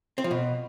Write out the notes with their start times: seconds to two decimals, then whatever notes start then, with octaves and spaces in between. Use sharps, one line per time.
0.18 C4
0.24 F3
0.31 B2